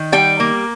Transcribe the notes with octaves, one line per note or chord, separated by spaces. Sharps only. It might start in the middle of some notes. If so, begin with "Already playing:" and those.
Already playing: D#3
G3 G5
A#3